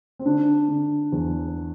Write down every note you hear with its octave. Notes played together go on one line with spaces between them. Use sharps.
C4
D3 D4
D3
E2